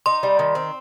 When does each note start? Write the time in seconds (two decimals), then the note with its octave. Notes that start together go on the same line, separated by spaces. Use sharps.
0.06 D#4 C6
0.23 G3
0.39 D#3
0.55 C4